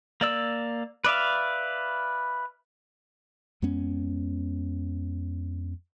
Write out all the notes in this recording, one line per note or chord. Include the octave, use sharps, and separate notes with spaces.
A#3 D5 E6
B4 D5 E5 F5
F2 G#3 B3 C#4